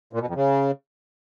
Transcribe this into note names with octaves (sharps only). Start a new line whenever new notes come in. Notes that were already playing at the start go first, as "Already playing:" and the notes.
A#2
B2
F2
C#3